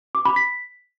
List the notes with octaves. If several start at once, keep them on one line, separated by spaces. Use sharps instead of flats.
D6
B5
B6